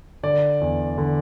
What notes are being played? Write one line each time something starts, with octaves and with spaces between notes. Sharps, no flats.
D3 D5
E2
D3